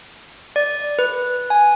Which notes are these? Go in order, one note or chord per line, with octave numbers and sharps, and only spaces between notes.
D5
B4
G#5